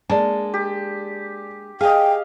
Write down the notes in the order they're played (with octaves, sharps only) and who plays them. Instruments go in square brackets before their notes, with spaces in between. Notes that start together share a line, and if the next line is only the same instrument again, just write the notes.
[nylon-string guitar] G#3 A#3 D4 [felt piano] D5 A5
[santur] G4
[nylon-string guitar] G#4 [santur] D#5 F5 [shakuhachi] G5